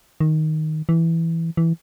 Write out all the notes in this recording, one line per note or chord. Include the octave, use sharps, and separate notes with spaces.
D#3
E3
E3